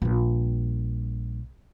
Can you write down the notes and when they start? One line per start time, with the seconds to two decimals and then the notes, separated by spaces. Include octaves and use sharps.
0.02 A#1 G3